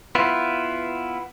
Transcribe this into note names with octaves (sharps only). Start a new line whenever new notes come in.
B3 E4 F4